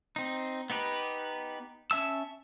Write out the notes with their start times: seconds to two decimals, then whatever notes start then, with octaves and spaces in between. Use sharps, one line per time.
0.16 C4 D#4
0.70 B3 D#4 G4 B4
1.91 C#4 E5 A5 E6